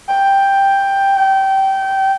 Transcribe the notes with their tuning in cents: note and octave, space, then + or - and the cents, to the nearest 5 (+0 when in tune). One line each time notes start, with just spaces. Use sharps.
G5 +5
G5 -20